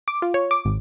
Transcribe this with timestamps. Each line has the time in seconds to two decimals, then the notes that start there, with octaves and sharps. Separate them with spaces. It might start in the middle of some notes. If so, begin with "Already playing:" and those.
0.08 D6
0.22 F4
0.34 C#5
0.51 D6
0.65 G#1